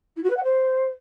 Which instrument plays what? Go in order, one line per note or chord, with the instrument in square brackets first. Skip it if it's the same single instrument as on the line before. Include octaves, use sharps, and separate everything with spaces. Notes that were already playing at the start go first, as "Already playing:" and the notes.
[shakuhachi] E4
F#4
B4
F#5
C5